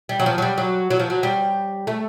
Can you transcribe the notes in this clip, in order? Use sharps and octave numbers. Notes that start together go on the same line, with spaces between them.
G3
F#3
F3
F#3
G3
F#3
F#3
F3
F#3
G3
A3